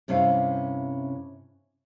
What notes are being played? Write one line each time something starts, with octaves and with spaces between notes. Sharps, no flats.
G2 C3 C#4 E4 F5